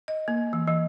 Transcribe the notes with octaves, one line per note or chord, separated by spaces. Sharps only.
D#5
A#3
E3
E3